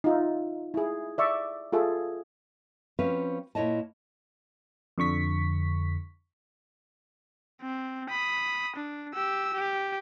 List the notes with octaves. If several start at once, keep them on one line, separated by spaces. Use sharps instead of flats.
D#4 F4 E5
E4 G#4
D5 E5 C#6
F4 G#4 A4 E5
F3 C4 C#4 F#4 B4 F5
A#2 E4 C#5 D#5 A5
F2 D3 C#6 B6
C4
B5 D#6
D4
G4 E6
G4